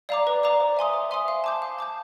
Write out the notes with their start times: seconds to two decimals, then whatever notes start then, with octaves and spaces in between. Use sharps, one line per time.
0.09 D5 F5 A#5 D6
0.27 B4
0.43 D5 F5 A#5 D6
0.60 C5
0.77 E5 G#5 C6 D#6
0.94 C5
1.11 E5 G#5 C6 D#6
1.28 F5
1.44 A5 D6 G6
1.62 F5
1.79 A5 D6 G6